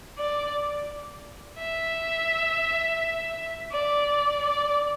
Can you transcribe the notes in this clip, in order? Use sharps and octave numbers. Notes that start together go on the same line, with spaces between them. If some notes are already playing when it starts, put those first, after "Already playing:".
D5
E5
D5
D5